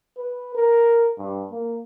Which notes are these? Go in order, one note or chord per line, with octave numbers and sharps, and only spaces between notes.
B4
A#4
G2
A#3